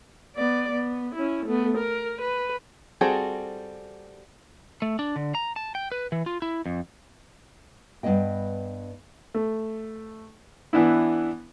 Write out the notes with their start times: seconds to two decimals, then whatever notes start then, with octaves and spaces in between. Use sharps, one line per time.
0.36 B3 D5
0.72 B3
1.15 C#4 E4
1.46 A3 B3
1.77 A#4
2.21 B4
3.01 G3 C4 F#4 G#4 A4
4.82 A3
4.99 D4
5.16 D3
5.35 A#5
5.56 A5
5.75 G5
5.92 B4
6.12 E3
6.26 F4
6.42 E4
6.66 F2
8.03 G2 A#3 B3 D#5 G5
9.34 A3
10.73 E3 B3 D4 E4